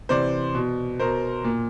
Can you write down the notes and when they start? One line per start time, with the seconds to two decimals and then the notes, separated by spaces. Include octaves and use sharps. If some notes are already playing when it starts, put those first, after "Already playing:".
0.09 C3 E3 C5 D5
0.55 B2
1.00 B2 A#4 C5
1.44 A#2